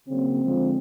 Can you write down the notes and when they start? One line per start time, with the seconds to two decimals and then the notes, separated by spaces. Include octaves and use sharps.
0.08 C#3 F#3 A#3 C4
0.42 D3 F3 G#3